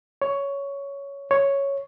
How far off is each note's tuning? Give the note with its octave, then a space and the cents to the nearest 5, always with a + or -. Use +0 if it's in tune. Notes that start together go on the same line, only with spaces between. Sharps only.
C#5 +10
C#5 +0